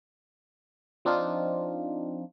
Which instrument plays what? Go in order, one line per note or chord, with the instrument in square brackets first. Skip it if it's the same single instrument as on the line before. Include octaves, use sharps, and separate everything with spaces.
[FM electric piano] F3 C4 D4 D#4 F4